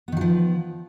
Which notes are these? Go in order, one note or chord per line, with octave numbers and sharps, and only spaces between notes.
D#3 F3 F#3 B3